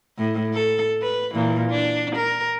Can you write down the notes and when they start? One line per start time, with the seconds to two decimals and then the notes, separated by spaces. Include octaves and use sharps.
0.18 A2
0.54 A4
1.02 B4
1.34 A#2 E3
1.70 D4
2.15 A#4